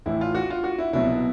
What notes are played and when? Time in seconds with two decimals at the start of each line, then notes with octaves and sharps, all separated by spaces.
0.06 A1 A2 E3 E4
0.21 F4
0.35 F#4
0.50 F4
0.64 F#4
0.78 E4
0.93 C2 B2 F#3 E4